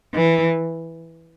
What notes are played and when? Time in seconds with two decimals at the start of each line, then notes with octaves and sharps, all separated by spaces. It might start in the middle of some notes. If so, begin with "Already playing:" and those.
0.15 E3